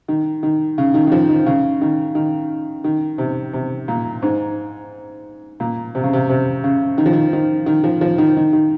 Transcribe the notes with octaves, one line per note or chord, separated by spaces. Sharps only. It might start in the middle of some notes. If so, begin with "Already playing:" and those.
D#3
D#3
C#3
D#3
D#3
F3
D#3
C#3
D#3
D#3
D#3
C3
C3
A#2
G#2
A#2
C3
C#3
C3
C3
C#3
D#3
F3
D#3
D#3
D#3
F3
F3
D#3
D#3
D#3